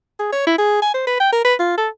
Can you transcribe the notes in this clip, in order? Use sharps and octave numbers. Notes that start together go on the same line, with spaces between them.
G#4
C#5
E4
G#4
G#5
C5
B4
G5
A#4
B4
F4
A4